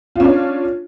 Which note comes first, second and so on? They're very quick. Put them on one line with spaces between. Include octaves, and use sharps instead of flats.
F4 C#4 D4